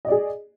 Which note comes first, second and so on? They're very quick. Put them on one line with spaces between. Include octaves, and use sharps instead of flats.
D#5 D5 G#4